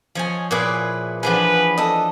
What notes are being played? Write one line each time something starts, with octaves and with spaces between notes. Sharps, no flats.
F3 C#5 D#5 G#5
A#2 E4 G#4 B4 D6
E3 F3 D4 G#4 B4 F#5
A4 D#5